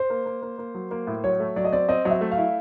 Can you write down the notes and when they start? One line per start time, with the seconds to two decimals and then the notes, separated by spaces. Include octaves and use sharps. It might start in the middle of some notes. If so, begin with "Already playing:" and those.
Already playing: C5
0.10 A#3
0.26 A#3
0.43 A#3
0.59 A#3
0.75 F#3
0.91 A#3
1.07 A2
1.24 F#3 C#5
1.40 A3
1.56 F#3 D5
1.64 D#5
1.72 C4 D5
1.89 C4 D#5
2.05 F#3 D#5
2.11 E5
2.21 A3
2.31 F5
2.38 E4